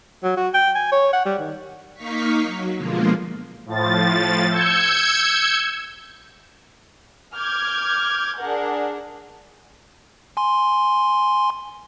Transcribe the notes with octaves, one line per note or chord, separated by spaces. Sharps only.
F#3
F#4
G5
G#5
C#5
F#5
G3
D#3
A#3 D#4 F5 C#6 B6
F#3
B2 D3 F3 G#3 A#3 F4
A2 F3 A6
E6 G6 G#6 C#7
D6 F6 G6 G#6
D4 G#4 A#4 F#5
G#5 C6